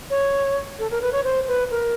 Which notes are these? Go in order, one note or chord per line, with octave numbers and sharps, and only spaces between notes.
C#5
A4
A#4
B4
C#5
C5
B4
A#4